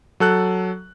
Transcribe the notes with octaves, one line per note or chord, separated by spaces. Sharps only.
F#3 A4 F#6